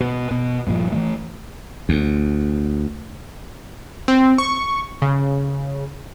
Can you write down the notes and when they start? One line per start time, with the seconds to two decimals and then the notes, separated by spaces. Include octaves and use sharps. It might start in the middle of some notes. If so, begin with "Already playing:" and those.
0.01 B2
0.31 B2
0.67 G2 A#2 F3
0.92 E3 F3 A3
1.89 D2
4.08 C4
4.38 C#6
5.02 C#3